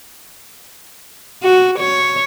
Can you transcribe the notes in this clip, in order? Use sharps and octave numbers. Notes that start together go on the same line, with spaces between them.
F#4
C#5